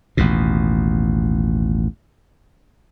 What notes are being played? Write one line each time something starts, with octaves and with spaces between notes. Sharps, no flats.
A1 D#2 B2